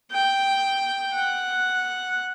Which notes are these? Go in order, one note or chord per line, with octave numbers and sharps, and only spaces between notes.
G5
F#5